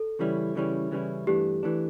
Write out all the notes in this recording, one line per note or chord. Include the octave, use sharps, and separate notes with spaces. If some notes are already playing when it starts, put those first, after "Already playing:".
Already playing: A4
C#3 E3 G3 C#4 E4
C#3 E3 G3 C#4 E4
C#3 E3 G3 C#4 E4
G2 E3 A3 D4 G4
E3 A3 D4